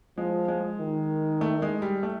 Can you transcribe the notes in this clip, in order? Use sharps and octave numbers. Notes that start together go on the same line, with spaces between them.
F3 G#3
G#3
D#3
A3
G#3
G3
A3